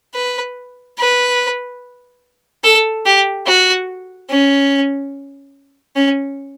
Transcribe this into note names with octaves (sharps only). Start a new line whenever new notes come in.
B4
B4
A4
G4
F#4
C#4
C#4